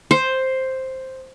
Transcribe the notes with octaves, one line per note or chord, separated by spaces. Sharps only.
C5